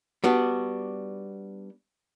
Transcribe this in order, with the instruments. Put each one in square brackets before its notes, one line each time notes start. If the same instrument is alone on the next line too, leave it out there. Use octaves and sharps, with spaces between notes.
[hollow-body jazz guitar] G3 B3 D4 F#4